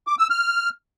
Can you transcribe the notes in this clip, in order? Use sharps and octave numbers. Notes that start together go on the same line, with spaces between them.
D6
E6
F6